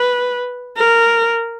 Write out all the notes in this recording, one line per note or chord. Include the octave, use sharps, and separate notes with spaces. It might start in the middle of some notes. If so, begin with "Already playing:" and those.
Already playing: B4
A#4